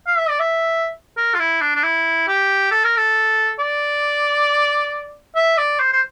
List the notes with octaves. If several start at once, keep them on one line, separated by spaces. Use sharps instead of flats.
F5
E5
D5
E5
A#4
F4
E4
D4
D4
E4
G4
A4
A#4
A4
D5
E5
D5
C5
C5